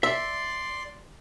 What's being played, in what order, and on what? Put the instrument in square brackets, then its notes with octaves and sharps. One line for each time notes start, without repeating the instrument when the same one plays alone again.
[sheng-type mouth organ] D5 C6 [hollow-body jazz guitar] E5